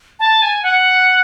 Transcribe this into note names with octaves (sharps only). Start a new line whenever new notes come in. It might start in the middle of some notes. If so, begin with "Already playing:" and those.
A5
G#5
F#5